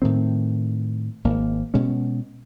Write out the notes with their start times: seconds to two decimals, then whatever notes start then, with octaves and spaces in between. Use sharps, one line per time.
0.02 A2 D#3 C4
1.24 G#1 A#3
1.74 B2 G#3 C#4